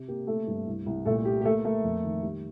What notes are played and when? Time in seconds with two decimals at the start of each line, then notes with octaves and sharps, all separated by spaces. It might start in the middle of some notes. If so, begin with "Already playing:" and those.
Already playing: C3
0.08 A#3 G4
0.27 A3 A#3 A4
0.47 G2
0.67 C2
0.86 C2
1.05 A#2 A3 A4
1.25 A#3 G4
1.41 G4
1.45 A3 A#3 A4
1.64 A3 A#3 A4
1.84 F2
2.04 D#3
2.23 G3